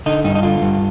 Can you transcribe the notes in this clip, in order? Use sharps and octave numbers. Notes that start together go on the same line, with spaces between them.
D3 D#4
G2 D#4
D#4
D3 F4
G2